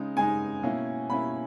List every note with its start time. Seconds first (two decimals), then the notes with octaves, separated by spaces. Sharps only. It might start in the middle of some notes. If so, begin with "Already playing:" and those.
Already playing: C#3 G#3 D#4
0.17 C#3 G#3 D#4 G#5
0.63 B2 A#3 C#4 E4
1.09 B2 A#3 C#4 E4 B5